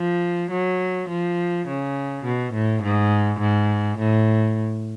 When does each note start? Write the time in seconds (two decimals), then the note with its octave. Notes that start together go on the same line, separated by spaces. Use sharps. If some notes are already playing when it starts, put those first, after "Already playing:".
Already playing: F3
0.50 F#3
1.08 F3
1.67 C#3
2.24 B2
2.53 A2
2.82 G#2
3.39 G#2
3.98 A2